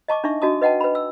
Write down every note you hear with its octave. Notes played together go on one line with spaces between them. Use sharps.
D#5 A5 C#6 D6
D4 D#4 E5 C#6
D4 F#4 D#5 A5 D#6
B4 D#5 F#5 G5 A5
B4 B5
E6